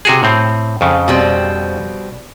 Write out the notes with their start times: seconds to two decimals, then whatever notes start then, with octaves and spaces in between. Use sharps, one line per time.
0.05 C3 F#4 G#4
0.23 A2 C4
0.81 F2 C#3
1.08 B2 G3 C4